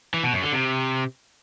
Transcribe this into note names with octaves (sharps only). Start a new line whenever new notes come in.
E3
B2
F#2
D3
C3